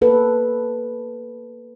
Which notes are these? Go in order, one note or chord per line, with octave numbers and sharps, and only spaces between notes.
A#3 A4 B4